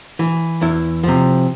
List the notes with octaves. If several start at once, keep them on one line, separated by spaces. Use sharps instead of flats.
E3
E2 E4
C3 F3